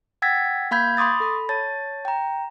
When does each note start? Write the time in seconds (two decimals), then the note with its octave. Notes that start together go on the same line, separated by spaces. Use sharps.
0.22 F#5 G5 E6 G#6 A6 B6
0.71 A#3 F5 B5 G6 G#6
0.97 B5 C6 D6 D#6 A6
1.20 A4 B5
1.49 C#5 A5 A6
2.05 G5 A#5